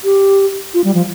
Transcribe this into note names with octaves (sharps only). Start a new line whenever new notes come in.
G4
F4
G3
F3